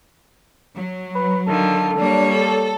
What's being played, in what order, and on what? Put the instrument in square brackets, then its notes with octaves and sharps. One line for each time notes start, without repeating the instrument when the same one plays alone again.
[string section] F#3
[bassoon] B4
[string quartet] D3 D#3 F4 [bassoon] A4
[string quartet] G3 A#3 C#5 [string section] D4
[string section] A4